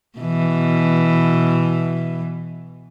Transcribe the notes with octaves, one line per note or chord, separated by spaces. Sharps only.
B2 E3